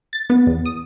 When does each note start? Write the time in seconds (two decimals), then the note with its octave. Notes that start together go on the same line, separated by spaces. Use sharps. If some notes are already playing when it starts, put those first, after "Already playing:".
0.13 A6
0.30 B3
0.47 E2
0.66 D#6